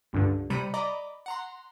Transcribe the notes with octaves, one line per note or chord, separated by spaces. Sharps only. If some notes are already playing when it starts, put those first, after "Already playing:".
C#2 G2 D3
C3 G3 A#5 B5 C#7 D#7
D5 D#5 A#5 B5 D6
F#5 A#5 C6